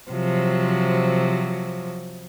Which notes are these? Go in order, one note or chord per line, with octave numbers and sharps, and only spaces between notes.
C3 F3 F#3